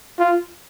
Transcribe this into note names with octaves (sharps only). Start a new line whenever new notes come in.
F4